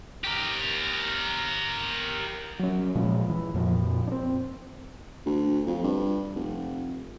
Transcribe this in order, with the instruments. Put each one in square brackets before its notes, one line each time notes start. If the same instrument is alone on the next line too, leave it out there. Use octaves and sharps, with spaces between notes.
[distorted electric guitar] G4 A#4
[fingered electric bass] F#3 C#4
A#2 F3 G#3
E3
F2 A#2 F3
C4 D4
[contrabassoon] D2
F2
G2
F1